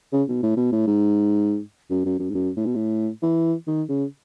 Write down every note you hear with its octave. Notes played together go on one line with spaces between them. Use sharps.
C#3
B2
A2
B2
A2
G#2
F#2
F#2
F#2
G#2
F#2
A2
B2
A2
E3
D#3
C#3